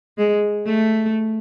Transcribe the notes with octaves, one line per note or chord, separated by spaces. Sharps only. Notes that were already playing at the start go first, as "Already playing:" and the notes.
G#3
A3